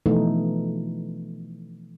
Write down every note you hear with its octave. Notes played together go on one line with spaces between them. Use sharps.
B2 E3 F3 A3 D#4